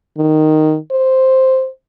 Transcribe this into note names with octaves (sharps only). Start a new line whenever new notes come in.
D#3
C5